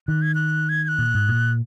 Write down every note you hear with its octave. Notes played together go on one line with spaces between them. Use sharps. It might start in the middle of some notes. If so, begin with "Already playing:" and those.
D#3 F#6
G#6
F#6
G#6
G#6
F#6
A#2
G#2
A#2